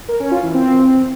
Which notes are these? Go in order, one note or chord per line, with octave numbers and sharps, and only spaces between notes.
A#4
C#4
F4
E3
C4